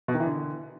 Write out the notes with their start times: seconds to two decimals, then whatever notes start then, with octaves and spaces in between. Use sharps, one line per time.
0.08 B2
0.14 D#3
0.20 E3
0.26 D3